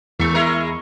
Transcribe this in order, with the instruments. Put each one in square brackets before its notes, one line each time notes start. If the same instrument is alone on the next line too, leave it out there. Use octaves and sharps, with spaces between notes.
[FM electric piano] E2 C#6 [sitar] G#3
[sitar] G#3 E4 A#4